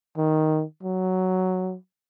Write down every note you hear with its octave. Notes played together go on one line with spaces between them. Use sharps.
D#3
F#3